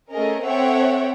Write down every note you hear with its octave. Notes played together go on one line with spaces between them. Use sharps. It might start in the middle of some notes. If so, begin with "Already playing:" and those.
A3 C#4 G#4 A#4 D#5
C4 A4 C#5 E5 F#5 G5